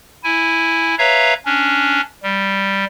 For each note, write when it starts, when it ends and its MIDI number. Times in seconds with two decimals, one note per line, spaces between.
0.24 0.95 64
0.24 0.95 80
0.98 1.34 71
0.98 1.34 73
0.98 1.34 76
0.98 1.34 77
0.98 1.34 82
1.45 2.01 61
1.45 2.01 62
2.23 2.85 55